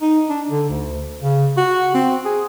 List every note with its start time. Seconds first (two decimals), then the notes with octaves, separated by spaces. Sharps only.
0.02 D#4
0.30 D4
0.50 D3
0.70 D2
1.22 C#3
1.57 F#4
1.94 C4
2.25 G#4